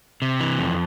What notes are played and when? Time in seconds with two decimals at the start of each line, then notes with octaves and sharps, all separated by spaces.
0.22 C3
0.40 E3
0.59 F2